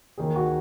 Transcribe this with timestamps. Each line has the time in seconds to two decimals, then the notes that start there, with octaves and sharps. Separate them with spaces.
0.18 D#2 D#3 G#4
0.36 F#4